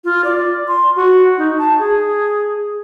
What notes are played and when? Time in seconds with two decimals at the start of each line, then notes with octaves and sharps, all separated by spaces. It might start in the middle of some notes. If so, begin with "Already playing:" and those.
0.04 F4
0.24 D5
0.68 C6
0.96 F#4
1.38 D#4
1.58 A5
1.79 G#4